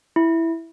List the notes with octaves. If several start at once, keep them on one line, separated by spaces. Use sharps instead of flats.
E4